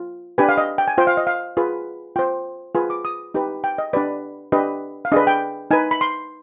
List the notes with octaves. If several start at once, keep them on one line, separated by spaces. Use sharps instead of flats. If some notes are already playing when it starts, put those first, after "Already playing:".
Already playing: F4
D4 G4 B4 G#5
F5
D#5
G5
G#5
F4 C5 G5
F5
D#5
F5
F4 G#4 B4
F4 C5 G5
F4 G#4 B4 G#5
D6
D#6
D#4 G4 B4
G5
D#5
D4 G4 B4 D5
D4 G4 B4 D#5
F5
D4 G#4 B4 D#5
G5
D#4 B4 G#5
B5
C6